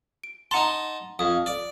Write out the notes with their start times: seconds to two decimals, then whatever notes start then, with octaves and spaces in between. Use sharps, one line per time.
0.24 D7
0.51 D#4 F#5 A5 A#5 C6
1.19 F2 D#6
1.46 D5